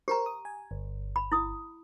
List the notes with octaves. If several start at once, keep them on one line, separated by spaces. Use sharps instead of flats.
G4 A#4 C5 A#5
D#6
G#5
G1
B5
E4 D#6